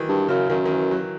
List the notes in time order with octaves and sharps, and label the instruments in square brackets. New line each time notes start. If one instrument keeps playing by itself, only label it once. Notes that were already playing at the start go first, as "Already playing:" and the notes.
Already playing: [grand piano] D#3 E3 F#3
[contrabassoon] G2
[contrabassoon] F#2 [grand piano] C#3
[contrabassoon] F#2 [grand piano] D#3
[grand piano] D#3
E3
F#3